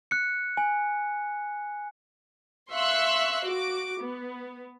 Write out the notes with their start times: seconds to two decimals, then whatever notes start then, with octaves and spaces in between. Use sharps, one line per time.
0.11 F#6 C#7
0.57 G#5
2.72 E5 F5 C6 C#6 E6 F#6
3.44 F#4 D6
3.99 B3